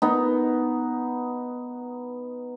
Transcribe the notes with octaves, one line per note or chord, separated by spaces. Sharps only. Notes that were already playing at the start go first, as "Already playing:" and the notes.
B3 D#4